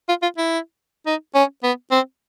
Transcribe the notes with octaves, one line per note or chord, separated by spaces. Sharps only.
F4
F4
E4
D#4
C#4
B3
C4